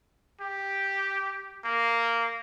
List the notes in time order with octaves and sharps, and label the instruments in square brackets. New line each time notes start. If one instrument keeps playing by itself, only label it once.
[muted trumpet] G4
A#3